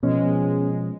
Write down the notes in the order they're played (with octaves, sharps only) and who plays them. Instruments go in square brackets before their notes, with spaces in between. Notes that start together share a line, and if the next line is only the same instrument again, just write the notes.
[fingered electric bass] B2 F3 [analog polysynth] G#3 [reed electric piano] B3 C#4